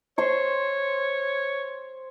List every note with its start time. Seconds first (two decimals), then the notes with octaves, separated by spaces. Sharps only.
0.18 C5 C#5 C6 C#6